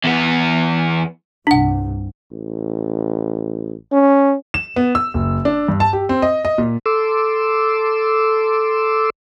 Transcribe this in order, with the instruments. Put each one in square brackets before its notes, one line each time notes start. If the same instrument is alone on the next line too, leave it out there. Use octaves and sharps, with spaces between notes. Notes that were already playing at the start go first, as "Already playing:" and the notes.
[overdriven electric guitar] E2 B3
[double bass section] C2 G2 C3 [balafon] D4 F#5
[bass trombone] A1
C#4
[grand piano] E7
B3
E6
F#1
D4
G2
A5
G4
C4
D#5
D#5
A#2
[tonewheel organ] A4 C6 D6 E6